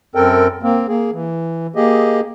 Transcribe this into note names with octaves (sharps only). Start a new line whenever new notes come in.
F#2 C4 A4 A#4 G5
A#3 C4
A#3 G#4
E3
A#3 G4 G#4 D#5